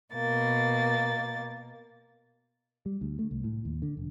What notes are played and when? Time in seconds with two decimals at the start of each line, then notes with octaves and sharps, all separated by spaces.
0.13 B2 A#3 A6
2.86 G3
3.01 D2
3.19 A3
3.31 C2
3.44 A2
3.65 D#2
3.82 D3
3.97 F1